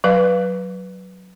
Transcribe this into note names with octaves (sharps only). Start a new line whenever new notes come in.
F#3 B4 F5